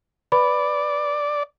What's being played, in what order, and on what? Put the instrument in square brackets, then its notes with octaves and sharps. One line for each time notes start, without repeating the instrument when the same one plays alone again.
[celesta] B4 B5 [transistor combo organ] D5